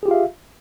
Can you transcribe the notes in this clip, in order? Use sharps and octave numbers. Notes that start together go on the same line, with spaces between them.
F4 G4 G#4 E5 F5